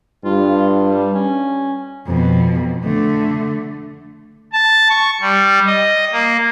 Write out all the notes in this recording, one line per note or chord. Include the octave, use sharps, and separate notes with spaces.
G2 F4
G3
C#4
F2 B2
D3 A3
A5
C#6
G3
D#5
A#3